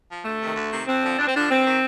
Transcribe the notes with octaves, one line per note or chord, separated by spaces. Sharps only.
F3
D2 A3
C3 D#3
D2
C3 D#3
F2 C4
D3 F3
F2 D4
C4
D3 F3 D4
G2 C4
D#3